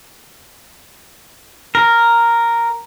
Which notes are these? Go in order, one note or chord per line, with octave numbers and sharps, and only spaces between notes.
A#4